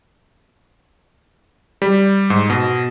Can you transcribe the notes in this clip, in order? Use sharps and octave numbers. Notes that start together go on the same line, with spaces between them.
G3
G#2
B2